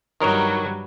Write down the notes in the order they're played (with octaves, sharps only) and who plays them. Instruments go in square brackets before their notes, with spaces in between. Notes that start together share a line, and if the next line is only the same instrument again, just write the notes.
[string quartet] G2 F#3 G3 [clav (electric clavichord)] D#3 A#4 C#5